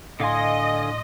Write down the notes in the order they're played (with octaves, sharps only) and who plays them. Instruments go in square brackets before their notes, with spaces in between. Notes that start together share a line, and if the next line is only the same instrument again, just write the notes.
[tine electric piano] A2 C6 [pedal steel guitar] D3 F5 G#5 [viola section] D#5